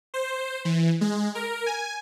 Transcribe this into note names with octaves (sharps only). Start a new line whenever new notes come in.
C5
E3
G#3
A#4
G#5